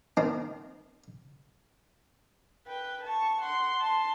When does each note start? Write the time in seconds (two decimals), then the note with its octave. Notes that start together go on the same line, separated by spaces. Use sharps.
0.17 D#3 C4
2.67 B4 G5
3.04 A5 C#6
3.41 F#5 C6
3.80 A5 C6